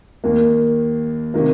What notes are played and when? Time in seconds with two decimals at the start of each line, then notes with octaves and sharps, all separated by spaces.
0.24 D#2 D#3 A#3
1.34 C3 D#3 A#3